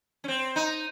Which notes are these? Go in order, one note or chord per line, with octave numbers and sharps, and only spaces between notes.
C#4
C4
D#4